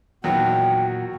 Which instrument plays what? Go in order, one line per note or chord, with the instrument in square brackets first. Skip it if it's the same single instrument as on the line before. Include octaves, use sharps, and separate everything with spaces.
[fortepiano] E2 D#3 F#3 [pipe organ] A#2 F#4 [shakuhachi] G5